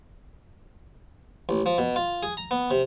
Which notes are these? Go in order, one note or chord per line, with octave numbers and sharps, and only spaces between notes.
A1
F3
B2
F4
G#4
A#5
B3
C3